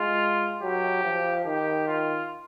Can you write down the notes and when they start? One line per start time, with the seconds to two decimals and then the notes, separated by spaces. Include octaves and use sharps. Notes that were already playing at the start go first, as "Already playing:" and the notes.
Already playing: G#3 F4
0.62 F#3 G4
1.04 F3
1.45 D#3 G4
1.87 F4